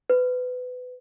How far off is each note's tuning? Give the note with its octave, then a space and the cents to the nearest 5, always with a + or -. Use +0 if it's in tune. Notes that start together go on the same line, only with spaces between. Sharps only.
B4 +25